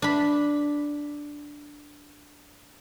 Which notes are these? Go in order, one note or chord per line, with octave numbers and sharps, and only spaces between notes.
D4 B5